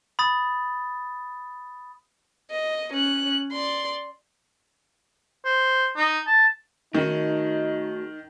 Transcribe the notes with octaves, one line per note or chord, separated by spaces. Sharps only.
B5 D#6 A6
D#5
C#4 F#6
D5 C6
C5
D#4
A5
D#3 A3 D#4 F#4 G#4